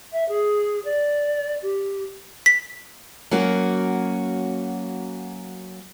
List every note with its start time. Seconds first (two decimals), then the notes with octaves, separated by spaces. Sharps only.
0.12 E5
0.28 G#4
0.84 D5
1.62 G4
2.46 B6
3.31 F#3 A#3 C#4 F#4